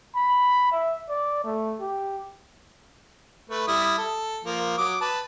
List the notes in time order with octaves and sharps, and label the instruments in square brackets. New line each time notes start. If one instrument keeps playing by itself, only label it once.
[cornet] B5
E5
D5
A3
G4
[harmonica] A3 B4
G3 E4 D#6
A4
F3 A#3
F#3 D6 D#6
B4 A5